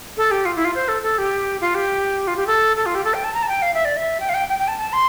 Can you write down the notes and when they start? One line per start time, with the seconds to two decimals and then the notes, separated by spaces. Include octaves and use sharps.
0.17 A4
0.31 G4
0.45 F4
0.56 E4
0.65 F4
0.75 C5
0.88 A4
1.03 A4
1.18 G4
1.61 F4
1.75 G4
2.28 F4
2.37 G4
2.47 A4
2.77 A4
2.86 F4
2.95 G4
3.05 A4
3.14 G5
3.24 A5
3.34 A#5
3.43 A5
3.48 G5
3.62 F5
3.74 E5
3.85 D5
3.97 E5
4.20 G5
4.29 F5
4.34 G5
4.49 G5
4.59 G5
4.68 A5
4.78 A5
4.93 C6